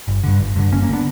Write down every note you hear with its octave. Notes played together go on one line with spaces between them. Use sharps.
G1
G2 D3
G1
G2 D3
G1 A#3 C#4
A#3 C#4
D3 B3 D4